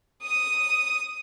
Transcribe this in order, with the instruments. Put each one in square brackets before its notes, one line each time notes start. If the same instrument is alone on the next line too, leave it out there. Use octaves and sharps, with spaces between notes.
[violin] D#6 D#7